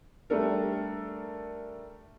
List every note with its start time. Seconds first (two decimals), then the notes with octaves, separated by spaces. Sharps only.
0.30 G3 A3 D4 A4 A#4